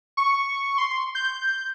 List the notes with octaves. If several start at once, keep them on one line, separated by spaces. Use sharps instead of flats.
C#6
C6
G6